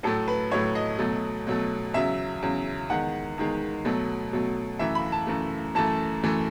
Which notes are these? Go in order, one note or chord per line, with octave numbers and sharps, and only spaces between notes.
A2 F#3 A3 A4
B4
A2 F#3 A3 C#5
D#5
B2 F#3 A3
B2 F#3 A3
E2 C#3 F#3 E5
E2 C#3 F#3
E2 D#3 G#3 F#5
E2 D#3 G#3
B2 F#3 A3
B2 F#3 A3
F#2 E3 A3 E5
B5
A5
F#2 E3 A3
F#2 E3 A3 A5
F#2 E3 A3